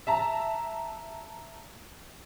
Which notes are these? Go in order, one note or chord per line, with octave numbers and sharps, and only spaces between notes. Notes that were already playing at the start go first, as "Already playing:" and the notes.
E5 A5 A#5